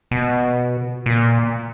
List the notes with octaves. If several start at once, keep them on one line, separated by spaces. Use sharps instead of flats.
B2
A#2